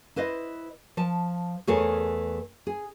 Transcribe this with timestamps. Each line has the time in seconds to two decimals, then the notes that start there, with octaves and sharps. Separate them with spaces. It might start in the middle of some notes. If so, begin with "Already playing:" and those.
0.16 E4 B4 C5 D#5
0.97 F3 A5
1.67 E2 E3 A3 G#4 A#4 C#5
2.67 G#4